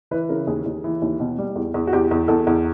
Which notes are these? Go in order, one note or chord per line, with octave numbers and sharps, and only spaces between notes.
E3 B4
C#3 A#4
D#2 G#4
D#2
E3
D#2
B2
G3
E2
E2
F#4
E2 G4
E2
E2 A4
E2